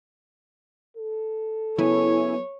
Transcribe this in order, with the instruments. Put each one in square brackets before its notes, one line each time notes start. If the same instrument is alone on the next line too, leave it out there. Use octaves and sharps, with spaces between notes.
[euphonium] A4
[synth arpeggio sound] C#3 E4 G#5 [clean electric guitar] F#3 B3 [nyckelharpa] C#5